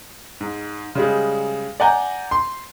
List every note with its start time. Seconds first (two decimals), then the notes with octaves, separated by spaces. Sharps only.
0.41 G#2
0.95 C#3 G3 G#3
1.80 D5 F#5 G#5 A#5 G6
2.31 C6